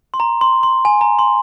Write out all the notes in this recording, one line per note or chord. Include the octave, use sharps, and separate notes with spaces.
C6
A#5
C6
C6
G#5
A#5
C6